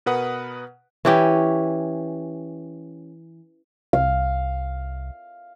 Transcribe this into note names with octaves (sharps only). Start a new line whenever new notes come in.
B2 A#4 B4 F#5 D#6
E3 C#4 G4
C2 F5